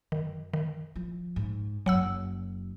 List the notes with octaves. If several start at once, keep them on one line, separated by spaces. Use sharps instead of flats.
F#2 D#3
D#3
F3
G#2
F#1 F#2 F#3 F#5 E6